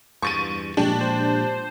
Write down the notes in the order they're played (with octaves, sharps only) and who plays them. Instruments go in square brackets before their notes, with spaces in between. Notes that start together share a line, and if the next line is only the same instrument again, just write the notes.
[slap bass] E2 G2 [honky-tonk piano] C#6 A6 D#7
[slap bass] A#2 F3 G#3 [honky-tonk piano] D4 G4
[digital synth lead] C5